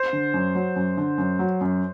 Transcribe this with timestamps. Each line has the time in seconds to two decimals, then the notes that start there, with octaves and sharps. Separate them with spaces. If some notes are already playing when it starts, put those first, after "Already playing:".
Already playing: C5
0.13 D3
0.34 F#2
0.55 F#3
0.76 F#2
0.97 D3
1.18 F#2
1.39 F#3
1.61 F#2